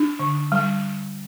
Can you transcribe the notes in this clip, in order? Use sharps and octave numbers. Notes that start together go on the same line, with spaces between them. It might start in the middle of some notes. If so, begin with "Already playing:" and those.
Already playing: D4
D3
G3